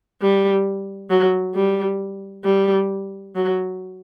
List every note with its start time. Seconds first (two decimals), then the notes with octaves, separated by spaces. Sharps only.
0.21 G3
1.10 F#3
1.55 G3
2.44 G3
3.35 F#3